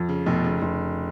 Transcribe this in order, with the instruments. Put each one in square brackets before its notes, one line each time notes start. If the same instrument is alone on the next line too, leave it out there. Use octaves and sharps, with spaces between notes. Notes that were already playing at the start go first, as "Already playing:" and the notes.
Already playing: [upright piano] F2
[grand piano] C#3
[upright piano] F1 [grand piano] B2
[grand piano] C#3
[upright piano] F1